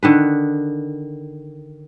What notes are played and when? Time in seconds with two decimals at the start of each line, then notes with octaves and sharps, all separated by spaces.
0.03 D3 D#3 B4